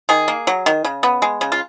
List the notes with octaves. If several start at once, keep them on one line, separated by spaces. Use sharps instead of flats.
D#3 G#4
A#3
F#3
D#3
C#3
B3
G#3
C#3
F4